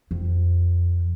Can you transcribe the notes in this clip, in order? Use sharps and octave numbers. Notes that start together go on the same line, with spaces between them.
F2